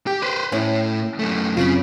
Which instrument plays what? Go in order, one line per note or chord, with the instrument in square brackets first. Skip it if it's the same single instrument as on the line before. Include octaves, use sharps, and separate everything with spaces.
[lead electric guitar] G4 [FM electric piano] G5
[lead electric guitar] B4 C5
[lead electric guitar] A2 [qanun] C#4 E4
[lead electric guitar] F#2 A3
[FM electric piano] F#2 C4 F4 [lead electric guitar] C#3 [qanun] B5 C#6 D6